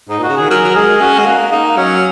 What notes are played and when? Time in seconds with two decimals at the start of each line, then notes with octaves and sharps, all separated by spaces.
0.09 G#2 D#4
0.19 A#2 F#4
0.29 C#3
0.37 D#3 G#4
0.50 F#3 A#4
0.65 F#3
0.75 G#3 G#4
1.01 C#4 F#4
1.19 G#3
1.26 A#3
1.51 A#3 D#4
1.77 F#3 C#4